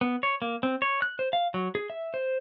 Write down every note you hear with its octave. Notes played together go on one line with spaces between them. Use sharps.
B3
C#5
A#3
C4
C#5
F#6
C5
F5
F#3
G#4
E5
C5